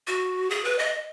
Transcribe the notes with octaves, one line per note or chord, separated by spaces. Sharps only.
F#4
G#4
B4
D#5